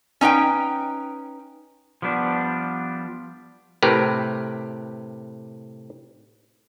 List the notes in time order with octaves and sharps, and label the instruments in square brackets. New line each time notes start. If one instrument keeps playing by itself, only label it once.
[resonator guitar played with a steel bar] C#4 D#4 B4 G5
[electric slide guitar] F3 G3 B3 D4
[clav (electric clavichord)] A2 C3 G4 A#4 B4